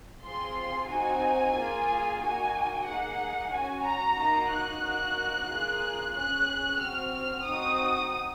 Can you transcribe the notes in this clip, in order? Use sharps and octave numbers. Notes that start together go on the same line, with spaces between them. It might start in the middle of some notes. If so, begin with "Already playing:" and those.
C4 F4 G#4 C6
C4 D#4 F#4 G#5
A#3 F4 G#4
A#3 D#4 F#4 G#5
A#3 D#4 G#4 F#5
C#4 F#4 G#5
A#5
A#3 D#4 F#4 A#5
F#6
A#3 D#4 F#4
A#3 F4 G#4
C#4 G#4 F#6
C4 F#4 F6
F6
C4 D#4 F#4 D#6